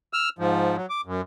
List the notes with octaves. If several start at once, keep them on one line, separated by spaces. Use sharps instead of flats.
E6 F6
G#2 F3
F#3
D6
F#2